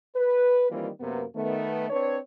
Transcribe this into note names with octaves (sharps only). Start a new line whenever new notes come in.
B4
D#3 E3 G3 A#3 C4 F4
F#2 C3 A#3 B3
D#3 A3 B3
C4 D4 B4 C#5